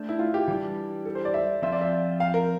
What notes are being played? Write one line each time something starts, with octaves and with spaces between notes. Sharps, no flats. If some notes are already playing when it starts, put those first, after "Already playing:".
Already playing: A3 D4 A4 C5
E4
F4
G4
E3 G3 D4
A4
C5
D5
E5
F3 C4 F4 C5 E5
D5
E5
F5
A#4